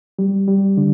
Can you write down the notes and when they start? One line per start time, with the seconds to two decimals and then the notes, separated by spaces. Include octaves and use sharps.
0.19 G3
0.48 G3
0.77 D3